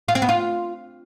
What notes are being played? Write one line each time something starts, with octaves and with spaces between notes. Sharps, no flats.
F4
C4
B3
F4